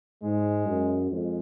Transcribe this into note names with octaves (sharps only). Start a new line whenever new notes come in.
G#2 G#3
F#2
F2 G#3